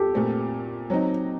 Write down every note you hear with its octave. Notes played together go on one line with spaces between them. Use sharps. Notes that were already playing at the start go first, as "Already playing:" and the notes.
Already playing: G4 A4
A#2 A3 C4
F#3 C4 D#4